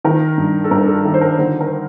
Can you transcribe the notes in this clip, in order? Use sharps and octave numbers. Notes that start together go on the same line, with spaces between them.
D#3 A#4
G2
A4
G2 A#4
A4
D#3
C5
A#4
D3 C5
A#4